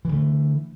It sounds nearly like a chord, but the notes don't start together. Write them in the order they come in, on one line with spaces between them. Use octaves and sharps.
E3 F3 D3 A3